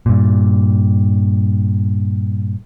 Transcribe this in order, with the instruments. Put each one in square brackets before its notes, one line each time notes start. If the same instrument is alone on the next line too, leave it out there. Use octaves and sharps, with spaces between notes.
[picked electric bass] G2 A#2